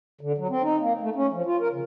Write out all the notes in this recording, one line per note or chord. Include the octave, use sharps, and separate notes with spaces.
D3
F#3
C4
D#4
A#3
A3
C#4
F3
F4
A#4
C#3